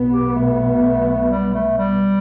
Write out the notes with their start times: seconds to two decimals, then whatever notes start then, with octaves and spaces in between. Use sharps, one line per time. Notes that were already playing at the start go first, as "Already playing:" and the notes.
Already playing: B1 B2 B3
0.12 G4
0.35 A3
1.07 A3
1.30 G3
1.54 A3
1.77 G3